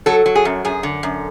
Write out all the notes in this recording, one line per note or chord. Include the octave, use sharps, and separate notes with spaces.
F#3 A4
F#3
G#4
F#2
F#2 G#4
D3
F#2